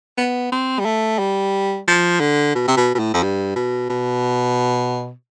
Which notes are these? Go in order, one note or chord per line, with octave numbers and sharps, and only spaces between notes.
B3
C4
G3
A3
G3
F3
D3
B2
C3
B2
B2
A2
F2
G2
B2
B2